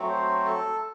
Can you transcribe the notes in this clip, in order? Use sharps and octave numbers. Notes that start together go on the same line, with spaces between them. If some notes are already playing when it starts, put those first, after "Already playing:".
Already playing: F#3 A3 C4
C5
A4